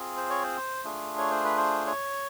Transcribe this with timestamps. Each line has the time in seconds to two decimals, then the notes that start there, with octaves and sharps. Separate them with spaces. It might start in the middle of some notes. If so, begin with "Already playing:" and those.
Already playing: C4 F4 G#4
0.17 C5
0.30 C#5
0.43 C5
0.84 A3 D4 F4 G#4
1.18 C#5
1.31 C5
1.44 B4
1.58 C5
1.86 C#5